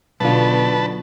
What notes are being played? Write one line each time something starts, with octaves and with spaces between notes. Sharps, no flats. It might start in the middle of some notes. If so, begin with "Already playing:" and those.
B1 B2 D3 F4 B4 A5